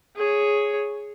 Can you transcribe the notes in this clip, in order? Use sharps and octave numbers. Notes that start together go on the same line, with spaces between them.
G#4 C#5